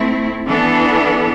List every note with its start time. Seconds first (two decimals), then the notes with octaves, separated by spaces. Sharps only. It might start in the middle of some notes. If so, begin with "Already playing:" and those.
Already playing: A3 C4 E4
0.47 E3 B3 D4 A4